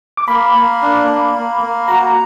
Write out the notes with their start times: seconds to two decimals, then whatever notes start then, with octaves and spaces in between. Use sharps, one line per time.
0.17 D6
0.28 A#3 B5
0.55 A#3
0.82 D4
1.08 A#3
1.35 A#3
1.61 A#3
1.88 F#4 A#5